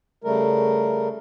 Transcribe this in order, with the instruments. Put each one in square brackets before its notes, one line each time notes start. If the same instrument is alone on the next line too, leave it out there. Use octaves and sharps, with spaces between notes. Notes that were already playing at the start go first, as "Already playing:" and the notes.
[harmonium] C#3 G3 A3 A#4